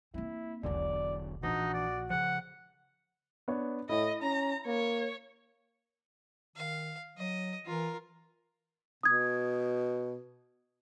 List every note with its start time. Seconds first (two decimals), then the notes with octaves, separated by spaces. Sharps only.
0.14 A#3 C4 E4
0.63 E1 B1 E2 D3 F#3 D5
1.43 A#1 E3 D4 D#4 F#4
1.74 D5
2.10 C#3 F3 F#5
3.48 B3 D4 C#5
3.89 A2 E4 D#5
4.22 C#4 A#5
4.67 A#3 C#5
6.56 D#3 F5
7.17 F#3 D#5
7.65 E3 F4 A#4
9.03 B2 D#6 G#6